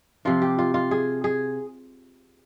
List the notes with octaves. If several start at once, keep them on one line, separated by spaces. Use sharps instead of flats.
C3 F3 F4
G4
F4
F4
G#4
G#4